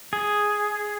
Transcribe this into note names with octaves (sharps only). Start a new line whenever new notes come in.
G#4